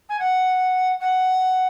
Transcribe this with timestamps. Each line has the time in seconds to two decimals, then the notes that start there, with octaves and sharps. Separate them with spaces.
0.09 G#5
0.19 F#5
1.00 F#5